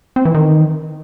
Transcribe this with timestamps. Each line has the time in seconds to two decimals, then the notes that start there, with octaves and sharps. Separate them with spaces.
0.16 C4
0.25 E3
0.34 D#3